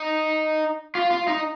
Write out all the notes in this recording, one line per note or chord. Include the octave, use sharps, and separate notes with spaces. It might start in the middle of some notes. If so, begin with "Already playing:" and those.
Already playing: D#4
F4
F4
D#4